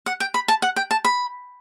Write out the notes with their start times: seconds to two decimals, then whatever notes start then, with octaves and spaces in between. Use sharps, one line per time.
0.06 F#5
0.20 G5
0.34 B5
0.48 A5
0.62 F#5
0.76 G5
0.91 A5
1.05 B5